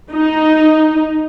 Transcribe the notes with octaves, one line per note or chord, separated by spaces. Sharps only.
D#4